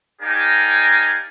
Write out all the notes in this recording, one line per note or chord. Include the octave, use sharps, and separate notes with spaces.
D#4 G4 A#4 D5 F5 G#5